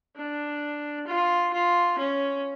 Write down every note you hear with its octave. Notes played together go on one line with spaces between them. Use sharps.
D4
F4
F4
C#4